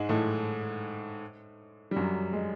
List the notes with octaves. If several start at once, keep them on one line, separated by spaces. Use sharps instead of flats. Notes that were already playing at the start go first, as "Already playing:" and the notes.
Already playing: G#2 G#3
A2 A3
G3
F#2 F#3
G#3